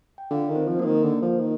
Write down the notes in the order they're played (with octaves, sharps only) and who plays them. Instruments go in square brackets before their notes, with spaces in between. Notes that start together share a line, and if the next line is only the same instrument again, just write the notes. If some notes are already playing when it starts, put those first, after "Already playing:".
[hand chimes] G5
[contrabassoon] D3 [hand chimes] F4 F5
[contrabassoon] D#3
[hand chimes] C4 C5
[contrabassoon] F3
[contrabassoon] F3 [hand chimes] A#3 A#4
[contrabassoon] D#3
[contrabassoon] D3 [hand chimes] A#3 A#4
[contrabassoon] F3
D#3